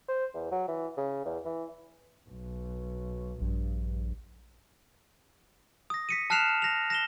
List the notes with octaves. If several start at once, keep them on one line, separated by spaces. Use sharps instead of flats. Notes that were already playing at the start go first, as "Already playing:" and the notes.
C5
E2
F#3
E3
C#3
E2
E3
B1
A#1 G2
D#6 A#6
B6 C#7 D#7
A5 F6 F#6 C7 E7 F7
A#6 F7
A#6 E7 G7